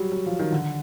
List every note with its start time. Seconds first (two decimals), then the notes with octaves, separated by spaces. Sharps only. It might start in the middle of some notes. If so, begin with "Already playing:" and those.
Already playing: F#3 G3
0.12 F#3
0.26 F3
0.39 D#3
0.52 D3